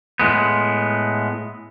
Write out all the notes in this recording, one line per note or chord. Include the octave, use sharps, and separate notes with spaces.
A2 G#3 B3